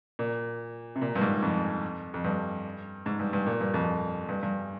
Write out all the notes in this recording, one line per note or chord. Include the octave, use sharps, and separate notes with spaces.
A#2
C3
A#2
G2
G#2
F2
F2
G2
G#2
G2
G2
A#2
G2
F2
G2
G2